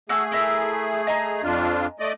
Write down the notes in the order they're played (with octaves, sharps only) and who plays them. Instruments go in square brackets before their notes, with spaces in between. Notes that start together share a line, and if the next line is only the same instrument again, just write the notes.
[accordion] A3 G#4 [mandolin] F#4 E6
[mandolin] E4 A#4 E5
D#5 G#5 A#5
[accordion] F2 D4 F4
A3 D5 D#5